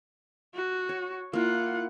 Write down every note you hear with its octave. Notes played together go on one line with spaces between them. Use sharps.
F#4
C#5
A#3 E4 F4 F#5